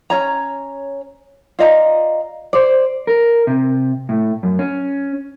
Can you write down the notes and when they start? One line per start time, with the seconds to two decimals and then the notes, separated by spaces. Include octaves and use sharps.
0.10 C#4 C#5 A#5
1.59 F4 D5 D#5 A#5
2.53 C5 D5
3.07 A#4
3.47 C3
4.09 A2
4.43 F#2
4.59 C#4